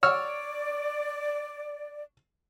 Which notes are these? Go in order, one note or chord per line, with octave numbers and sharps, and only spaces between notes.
C#5 D5 E6 F6